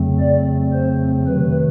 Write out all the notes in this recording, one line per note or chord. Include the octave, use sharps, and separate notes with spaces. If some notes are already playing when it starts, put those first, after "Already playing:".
Already playing: F2 C#3 F#3 A3 C4
D5
C5
C3 D#3 F#3 A3 B4